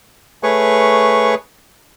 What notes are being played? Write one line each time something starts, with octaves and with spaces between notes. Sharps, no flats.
A3 G#4 B4 C#5 C#6